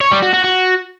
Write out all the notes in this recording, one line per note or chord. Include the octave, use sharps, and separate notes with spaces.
C#5
G3
F#4
F#4
F#4